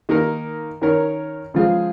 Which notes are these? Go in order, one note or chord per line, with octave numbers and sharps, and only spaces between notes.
D#3 A#3 D#4 A#4
D#3 C#4 A#4 C#5
C#3 F3 G#3 F4 G#4